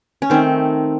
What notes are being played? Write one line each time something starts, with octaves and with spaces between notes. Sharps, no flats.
C#4
D#3 A3 C4